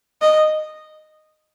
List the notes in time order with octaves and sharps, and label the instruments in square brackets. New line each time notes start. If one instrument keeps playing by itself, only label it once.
[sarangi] D#5